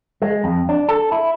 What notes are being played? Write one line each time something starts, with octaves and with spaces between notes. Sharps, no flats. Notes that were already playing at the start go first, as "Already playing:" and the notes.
G#3
F2
D4
A4
E4